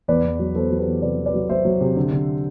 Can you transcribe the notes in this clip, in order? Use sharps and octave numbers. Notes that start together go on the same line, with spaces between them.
E2 B4 D5
E2
F#3
E2 A4 C5
F#3
G4 B4
E2
C3 B4 D5
E2
B4 D5
F#3
F#3 C5 E5
F#3
C3
D3
D3